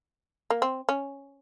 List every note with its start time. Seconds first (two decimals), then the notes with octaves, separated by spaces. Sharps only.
0.50 A#3
0.62 C4
0.89 C#4